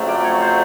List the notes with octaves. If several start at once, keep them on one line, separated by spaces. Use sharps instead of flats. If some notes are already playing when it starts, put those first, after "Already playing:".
Already playing: F2 C#3 F#3 A3
D5
C#5
C5